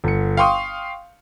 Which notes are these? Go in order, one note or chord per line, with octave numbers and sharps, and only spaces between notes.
G1 C#7
F5 G5 C6 C#6 D#6